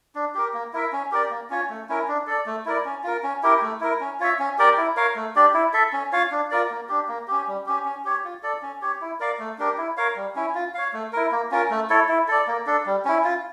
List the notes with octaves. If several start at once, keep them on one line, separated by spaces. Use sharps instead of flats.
D4
G4 A#4
A#3
E4 A#4 E5
C#4
G4 A#4 D5
A#3
C#4 F4 C#5
A3
C#4 E4 A#4
D4
A4 D5
A3
E4 A#4 D5
C#4
F4 A#4
C#4
E4 G4 A#4
A3
E4 A#4
C#4
F4 C#5 E5
C#4
G4 A#4 D5
E4
A#4 C#5 F5
A3
D4 G4 D5
E4
A4 E5
C#4
F4 C#5 F5
D4
F4 A#4 D5
A#3
D4 G4
A#3
C#4 G4
G3
C#4 G4
C#4
G4 C#5
F4
A4 D5
C#4
G4 C#5
E4
A#4 D5 F5
A3
D4 G4 A#4
E4
A#4 C#5 F5
G3
C#4 E4
F4
C#5 F5
A3
E4 A#4
A#3
C#4 F4 A#4
A3
E4 A4 C#5
E4
A4 D5
A#3
D4 A4
G3
C#4 E4
F4